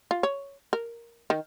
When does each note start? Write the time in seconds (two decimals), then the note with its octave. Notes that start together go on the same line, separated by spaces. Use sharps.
0.11 F4
0.23 C#5
0.73 A#4
1.30 D#3